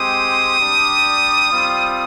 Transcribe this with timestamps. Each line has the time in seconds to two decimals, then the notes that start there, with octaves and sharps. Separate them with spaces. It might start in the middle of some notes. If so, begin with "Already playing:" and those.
Already playing: G#3 C4 G4 D#6
0.58 G3 D4 G4
1.52 G3 C4 F4